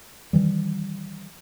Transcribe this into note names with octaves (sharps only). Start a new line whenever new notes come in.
D#3 E3 G3